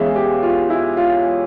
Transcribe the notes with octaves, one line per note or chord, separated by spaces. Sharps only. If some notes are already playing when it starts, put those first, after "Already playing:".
Already playing: E2 E3 G#3 C#4 E5 F5
G4
F4
E4
F4